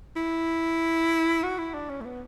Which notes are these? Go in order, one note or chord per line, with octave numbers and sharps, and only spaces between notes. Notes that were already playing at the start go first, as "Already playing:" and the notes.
E4
F#4
E4
D4
C#4
A3
B3